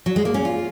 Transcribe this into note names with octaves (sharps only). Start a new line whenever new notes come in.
F#3
G#3
A#3
C#4
F4